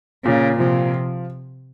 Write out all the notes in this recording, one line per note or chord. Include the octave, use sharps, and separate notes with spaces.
A#2 C#3
C3 F3